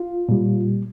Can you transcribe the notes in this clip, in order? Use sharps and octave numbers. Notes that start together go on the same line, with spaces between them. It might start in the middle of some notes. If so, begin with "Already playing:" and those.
Already playing: F4
A#2 G3